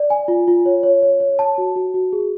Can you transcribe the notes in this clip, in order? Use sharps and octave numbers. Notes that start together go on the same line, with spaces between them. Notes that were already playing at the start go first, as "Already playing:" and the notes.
Already playing: D5
G#5
F4
F4
C#5
C#5
C#5
C#5
A5
F#4
F#4
F#4
G#4